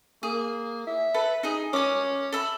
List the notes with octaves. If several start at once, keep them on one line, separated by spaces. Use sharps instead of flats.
A#3 G#4
E5
A4 B4 B5
D#4 G#4
C#4 G#5 D6
A4 E5 B5